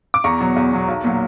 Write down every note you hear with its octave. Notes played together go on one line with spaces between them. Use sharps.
D6
E2 A#5 C#6
B2 F#3
E2
B2 F#3
B1
A#2 F#3